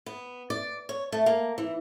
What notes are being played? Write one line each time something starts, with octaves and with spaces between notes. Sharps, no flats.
B3
D5
C#5
A3
A#3
E3